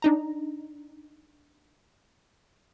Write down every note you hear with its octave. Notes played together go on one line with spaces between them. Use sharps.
D4 D#4 A#5